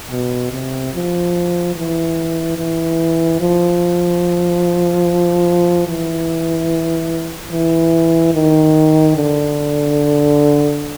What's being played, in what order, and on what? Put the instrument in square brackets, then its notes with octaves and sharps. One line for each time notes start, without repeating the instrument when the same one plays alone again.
[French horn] B2
C3
F3
E3
E3
F3
E3
E3
D#3
D3